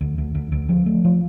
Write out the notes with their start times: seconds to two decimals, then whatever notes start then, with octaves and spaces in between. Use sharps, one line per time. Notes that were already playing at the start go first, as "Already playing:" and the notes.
0.01 D2
0.18 D2
0.35 D2
0.52 D2
0.69 F3
0.86 A3
1.04 F3